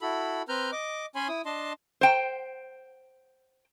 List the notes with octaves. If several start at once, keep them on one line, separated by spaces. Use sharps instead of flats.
E4 F#4 A4 B5
C4 B4 A#5 F6 G6
D#5 D6
C#4 C#5 G#5 B5 C6
E4 D#6
D4 D#5 A5 C6
C5 G5